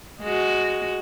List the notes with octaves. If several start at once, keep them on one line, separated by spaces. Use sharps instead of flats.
G#3 F#4